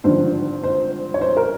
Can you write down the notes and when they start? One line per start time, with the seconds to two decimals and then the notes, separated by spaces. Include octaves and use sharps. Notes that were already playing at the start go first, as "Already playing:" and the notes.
0.04 G#1 G2 D3 F3 C5
0.63 C5
1.14 C#5
1.21 C5
1.37 A#4